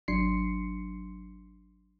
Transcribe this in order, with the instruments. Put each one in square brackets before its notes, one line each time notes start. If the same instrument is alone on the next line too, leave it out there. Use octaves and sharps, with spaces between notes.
[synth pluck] G#1 F#3 D4 C6 C7 C#7